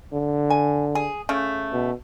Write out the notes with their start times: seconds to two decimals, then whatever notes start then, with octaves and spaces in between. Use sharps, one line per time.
0.13 D3
0.50 G#5
0.95 G#4
1.29 C#3 A3
1.73 B2